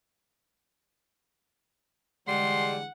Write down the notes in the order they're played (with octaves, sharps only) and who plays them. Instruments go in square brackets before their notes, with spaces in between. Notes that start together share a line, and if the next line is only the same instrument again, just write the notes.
[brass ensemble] D3 E3 G#3 [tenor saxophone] G3 [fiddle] F#5 [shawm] C6